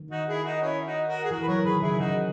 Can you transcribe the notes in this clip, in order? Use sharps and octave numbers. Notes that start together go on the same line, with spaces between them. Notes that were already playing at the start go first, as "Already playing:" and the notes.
Already playing: D#3
D#4 F#4
E4 G#4
D#4 F#4
C#4 E4
D#4 F#4
F#4 A#4
G#4
E3 F#4 A#4
B4
F#3 A#4 C#5
D#3 G#4 B4
C#3 E4 G#4
E4
C#3 D#4 F#4